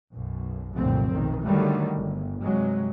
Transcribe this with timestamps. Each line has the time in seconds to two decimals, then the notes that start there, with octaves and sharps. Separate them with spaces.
0.11 B1 F#2
0.74 F1 C2 F#2 A#2 D3 C4
1.11 B1 A2 D#3
1.46 D3 D#3 F#3 G3 A3
1.98 G1
2.41 G2 C3 F#3 G#3